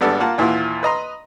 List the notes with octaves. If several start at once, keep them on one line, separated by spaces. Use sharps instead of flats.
G#1 G3 B3 D4 A4
A#3 F4 F#5 A5
D#2 A#2 E3 E4 F4 F#5
B4 D#5 A#5 C6